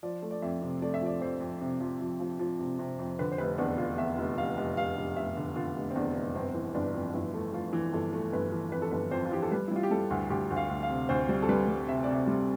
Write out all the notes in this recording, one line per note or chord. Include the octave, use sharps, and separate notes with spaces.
F3 D5
A3
D5
F2 E5
C3
A3 D5
E5
F3 D5
F2 C5
F2
C3
F3
F3
F3
F3
C3
C3
F2
D3 B4
C5
F1 B4
E2 D4
D3 F4
E2 E5
F1
F1 F5
F1
F1 F5
F1
F1 E5
D3
D3 F4
F1
C4
E2 D4
F1
G1 C4
E3
G1 D4
F2
G1 E4
A3
A3 F4
E3
G1 A4
A3
G1 B4
E3
F2 B4
A4
G1 B4
F2 C5
F4
E3 G4
A4
G3 B4
E4
G3 F4
G4
G3 A4
D2
D2 G4
D2
F5
D2
F5
C3
D2 C5
G3
A4
G3 B4
G3
C3 E5
C3 D5
E5
G3